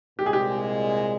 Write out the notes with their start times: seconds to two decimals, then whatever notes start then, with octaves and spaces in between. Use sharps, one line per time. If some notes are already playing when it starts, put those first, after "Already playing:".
0.19 C2 A#2 G#3 G4
0.26 G#4
0.33 G4